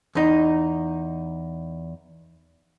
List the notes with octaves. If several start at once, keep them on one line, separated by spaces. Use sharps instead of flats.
E2 D#4